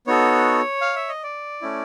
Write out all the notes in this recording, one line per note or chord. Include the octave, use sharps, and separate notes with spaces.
B3 D#4 F#4 A4 C#5
F5
E5
D#5
D5
A3 C#4 E4